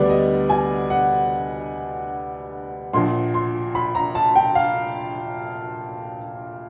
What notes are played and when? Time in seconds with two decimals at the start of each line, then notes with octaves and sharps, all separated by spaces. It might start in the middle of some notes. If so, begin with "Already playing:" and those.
Already playing: D2 D3 G3 B3 D5
0.09 D#5
0.50 G#5
0.90 F#5
2.93 A#1 A#2 F3 C6
3.34 C6
3.75 B5
3.95 A#5
4.15 A5
4.35 G5
4.55 F5